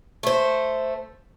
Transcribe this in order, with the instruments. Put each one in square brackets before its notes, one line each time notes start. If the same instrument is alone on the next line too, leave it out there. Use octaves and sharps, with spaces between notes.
[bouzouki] A3 C5